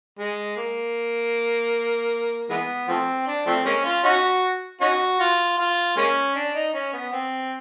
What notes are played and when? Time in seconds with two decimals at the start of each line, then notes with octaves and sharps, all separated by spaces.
0.19 G#3
0.57 A#3
2.50 E3 G#3 B3
2.88 F3 A3 C4
3.27 D4
3.46 F3 A3 C4
3.65 G#3 A#3 C#4
3.85 F4
4.04 C#4 D#4 F#4
4.81 C#4 D#4 F#4
5.20 F4
5.58 F4
5.97 G#3 A#3 C#4
6.35 D4
6.55 D#4
6.74 C#4
6.93 B3
7.12 C4